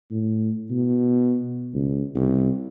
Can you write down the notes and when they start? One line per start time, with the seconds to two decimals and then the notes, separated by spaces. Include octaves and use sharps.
0.11 A2
0.70 B2
1.73 C#2
2.16 C2